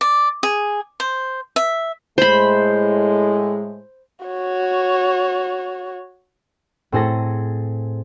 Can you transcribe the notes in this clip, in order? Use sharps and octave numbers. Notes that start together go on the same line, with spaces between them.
D5
G#4
C5
E5
A2 G#3 C5 B5
F#4 C#5
A2 C4 G#4 A4 A#6